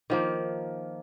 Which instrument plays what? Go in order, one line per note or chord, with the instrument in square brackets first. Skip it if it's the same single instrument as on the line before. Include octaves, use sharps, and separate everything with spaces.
[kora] D#3 F3 A#3